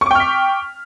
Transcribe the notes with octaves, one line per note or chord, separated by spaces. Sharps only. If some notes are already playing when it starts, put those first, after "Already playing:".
G5 C#6 D6 F6 B6